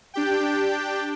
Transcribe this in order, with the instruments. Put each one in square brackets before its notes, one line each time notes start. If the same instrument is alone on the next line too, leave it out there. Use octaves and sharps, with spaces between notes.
[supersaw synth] D4 G4 G5